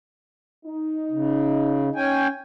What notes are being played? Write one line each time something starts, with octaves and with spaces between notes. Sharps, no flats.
D#4
C#3
C#4 G5 G#5